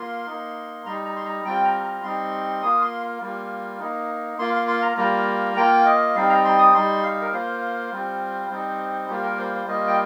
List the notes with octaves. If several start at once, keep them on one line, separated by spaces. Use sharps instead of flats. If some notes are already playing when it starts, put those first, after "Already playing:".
Already playing: A#3 F4 C6
A#3 D#4
G3 D#4 A#5
A#5
C6
A#5
G3 C4 F4 G5
A#5
A#5
G3 C4 D#4 C6
A#3 F4 D#6
C6
G3 A#3 F4
A#3 D#4
A#3 F4 C6
C6
C6
A#5
G3 A#3 F4 A#5
A#3 F4 G5
D#5
G3 C4 D#4 F5
A#5
C6
D#6
G3 D#4 C6
F5
A#4
A#3 F4 C5
G3 C4 F4
G3 C4 D#4
G3 A#3 F4 G4
A#4
C5
C5
G3 A#3 F4 D#5
G5